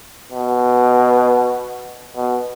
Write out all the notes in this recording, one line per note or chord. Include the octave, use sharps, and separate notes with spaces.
B2
B2